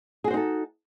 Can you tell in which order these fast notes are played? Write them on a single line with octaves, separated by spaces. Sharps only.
G#4 F#4 C5 D#4 A4